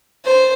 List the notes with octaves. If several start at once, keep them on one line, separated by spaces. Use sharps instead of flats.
C5